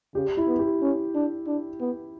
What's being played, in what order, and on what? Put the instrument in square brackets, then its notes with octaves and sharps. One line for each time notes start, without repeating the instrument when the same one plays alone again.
[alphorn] C#3 [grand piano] G4
[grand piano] E4
[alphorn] B3
[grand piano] G4
[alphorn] C#4
D4
D4
B3